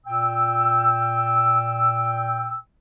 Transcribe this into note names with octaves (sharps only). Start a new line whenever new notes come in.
A#2 G5 E6